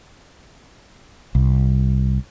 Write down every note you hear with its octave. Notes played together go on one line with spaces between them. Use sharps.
C2